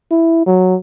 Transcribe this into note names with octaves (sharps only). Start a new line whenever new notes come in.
E4
F#3